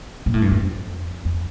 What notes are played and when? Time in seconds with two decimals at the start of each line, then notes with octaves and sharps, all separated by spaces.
0.26 A#2
0.34 A2
0.42 G2
0.51 F2
1.25 F2